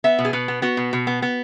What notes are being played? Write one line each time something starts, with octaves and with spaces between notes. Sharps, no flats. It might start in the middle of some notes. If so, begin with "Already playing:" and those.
B3 E5
B2
G#4
B2 B4
B3
B3 F#4
B2
B2
B3
B3